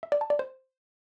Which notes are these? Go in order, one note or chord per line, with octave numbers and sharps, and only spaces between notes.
E5
D5
A5
D5
C5